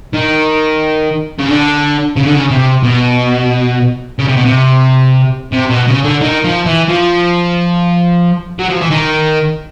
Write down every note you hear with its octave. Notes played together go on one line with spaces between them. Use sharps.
D#3
C#3
D3
C#3
D3
C#3
C3
B2
C#3
C3
B2
C3
C3
B2
C#3
D3
D#3
F3
E3
F3
F#3
F3
E3
D#3